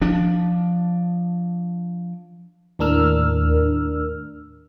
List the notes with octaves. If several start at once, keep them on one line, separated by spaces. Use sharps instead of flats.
F3 D4
D#2 A2 D4 A#4 E6 F6